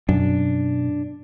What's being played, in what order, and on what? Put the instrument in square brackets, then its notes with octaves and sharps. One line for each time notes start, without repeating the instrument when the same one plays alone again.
[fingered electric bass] F#2 [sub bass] B2 [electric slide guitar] D4